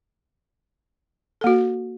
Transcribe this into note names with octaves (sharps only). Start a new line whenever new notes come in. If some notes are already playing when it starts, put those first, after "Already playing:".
A#3 F#4 A4